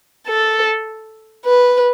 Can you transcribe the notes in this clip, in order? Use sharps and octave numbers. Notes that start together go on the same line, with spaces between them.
A4
B4